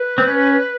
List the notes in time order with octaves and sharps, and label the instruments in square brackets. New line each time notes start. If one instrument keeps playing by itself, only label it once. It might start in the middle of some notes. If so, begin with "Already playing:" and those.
Already playing: [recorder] B4
[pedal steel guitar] C4
C#4